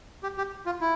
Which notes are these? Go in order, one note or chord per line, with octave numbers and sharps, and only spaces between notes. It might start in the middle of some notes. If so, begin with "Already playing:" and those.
G4
G4
F4
E4